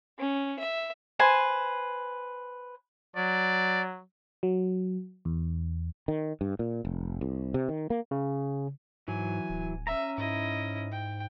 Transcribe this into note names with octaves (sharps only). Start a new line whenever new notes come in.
C#4
E5
B4 C5 G#5
F#3 D5
F#3
E2
D#3
G2
A#2
F1
C2
C3
D#3
A#3
C#3
G#2 E3 F#3 G#5
D1
C#4 E5 A#5
G#2 E4 D#5
G5